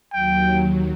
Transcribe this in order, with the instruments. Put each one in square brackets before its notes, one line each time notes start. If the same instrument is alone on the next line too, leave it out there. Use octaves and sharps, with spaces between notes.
[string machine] D#2 F#3 [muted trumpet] G5